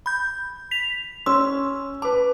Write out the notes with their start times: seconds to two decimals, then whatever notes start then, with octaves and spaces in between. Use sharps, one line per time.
0.06 B5 G6
0.71 B6 F7
1.26 C#4 C6 E6
2.02 B4 A5 D6